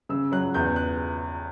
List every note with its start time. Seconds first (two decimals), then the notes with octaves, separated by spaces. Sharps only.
0.09 C#3 E6
0.32 F#3 F#6
0.54 E2 G6
0.76 F#6